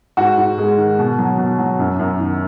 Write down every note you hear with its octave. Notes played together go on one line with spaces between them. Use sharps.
G#2 F#4
G#2
G#3
D#3
B2
F#3
B2
F#3
F#2
F#2
D#3